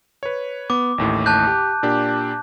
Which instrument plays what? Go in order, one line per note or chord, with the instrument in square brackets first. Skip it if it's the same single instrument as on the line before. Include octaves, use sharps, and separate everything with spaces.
[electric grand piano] B4 C#5
[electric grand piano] B3 [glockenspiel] D6
[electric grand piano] A1 D#2 A2
[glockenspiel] A5 F#6 G6
[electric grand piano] G4
A#2 D4 G4